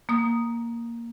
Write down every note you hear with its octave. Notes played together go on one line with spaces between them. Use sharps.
A#3 D#6